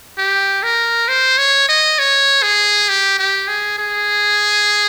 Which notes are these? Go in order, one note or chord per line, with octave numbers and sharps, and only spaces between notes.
G4
A#4
C5
C#5
D#5
C#5
G#4
G4
G4
G#4
G#4